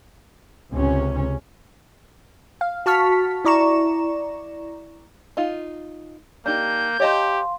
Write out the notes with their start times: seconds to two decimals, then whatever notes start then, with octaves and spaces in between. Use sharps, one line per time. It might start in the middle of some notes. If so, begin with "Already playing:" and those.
0.72 C#2 C3 C#4
2.61 F5
2.86 F#4 A5 C#6 F6 B6
3.45 E4 D5 A#5 C#6 E7
5.37 D#4 F4
6.46 A#3 D4 D#4 G4 G6
7.00 G4 C#5 D#5 F5 A5 C6